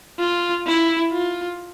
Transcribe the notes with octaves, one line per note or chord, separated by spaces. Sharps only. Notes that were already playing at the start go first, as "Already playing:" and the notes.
F4
E4
F4